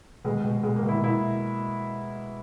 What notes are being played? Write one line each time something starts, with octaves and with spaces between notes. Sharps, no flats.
B2 G#3
B2
B2 G#3
A#3
B2
E4
B2 E4